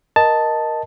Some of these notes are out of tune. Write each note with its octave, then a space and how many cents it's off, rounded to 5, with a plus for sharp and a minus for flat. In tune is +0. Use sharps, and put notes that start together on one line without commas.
A#4 +10 D#5 +0 A5 +0